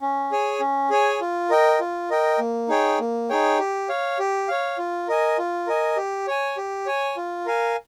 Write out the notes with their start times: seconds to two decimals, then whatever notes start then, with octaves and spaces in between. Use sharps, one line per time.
0.01 C#4
0.31 G#4 C#5 G#5
0.60 C#4
0.90 G#4 C#5 G#5
1.21 F4
1.50 A#4 D#5 G5
1.80 F4
2.10 A#4 D#5 G5
2.39 A#3
2.69 D#4 G#4 C#5 G5
3.00 A#3
3.29 D#4 G#4 C#5 G5
3.59 G4
3.89 C#5 F5
4.19 G4
4.48 C#5 F5
4.78 F4
5.08 A#4 D#5 G#5
5.38 F4
5.67 A#4 D#5 G#5
5.97 G4
6.28 C#5 G#5
6.57 G4
6.86 C#5 G#5
7.17 F4
7.46 A#4 F5 G#5